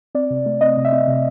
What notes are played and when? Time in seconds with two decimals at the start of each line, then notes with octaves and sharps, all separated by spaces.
0.15 C4 D5
0.30 C3
0.46 A3
0.61 C4 D#5
0.77 C3
0.85 E5
0.92 C4
1.08 C3